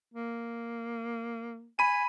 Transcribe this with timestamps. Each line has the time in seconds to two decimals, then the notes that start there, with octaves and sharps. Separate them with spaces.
0.14 A#3
1.79 G#5 B5 D#7